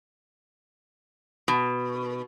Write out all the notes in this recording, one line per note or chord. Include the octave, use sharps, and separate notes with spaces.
B2